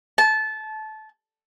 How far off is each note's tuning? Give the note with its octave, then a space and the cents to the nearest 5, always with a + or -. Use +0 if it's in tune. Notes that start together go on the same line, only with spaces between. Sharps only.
A5 -20